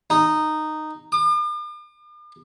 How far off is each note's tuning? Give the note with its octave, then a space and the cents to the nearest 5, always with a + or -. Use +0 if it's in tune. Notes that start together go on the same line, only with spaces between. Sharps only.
D#4 -10
D6 +45